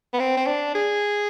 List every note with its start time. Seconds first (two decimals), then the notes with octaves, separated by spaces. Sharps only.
0.13 B3
0.20 C4
0.37 C4
0.47 D4
0.75 G#4